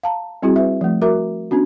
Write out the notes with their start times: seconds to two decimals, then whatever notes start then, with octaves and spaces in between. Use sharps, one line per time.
0.03 F5 A5 A#5
0.43 G3 C4 E4 F#4 G#4
0.56 B4 E5
0.81 F3 A3
1.02 F#4 A#4 E5 A#5 D6
1.51 B3 C#4 D4 F#4